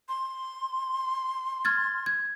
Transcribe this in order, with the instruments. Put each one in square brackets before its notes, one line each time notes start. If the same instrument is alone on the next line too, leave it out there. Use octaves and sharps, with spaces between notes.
[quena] C6
[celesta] F6 G#6 A6
G#6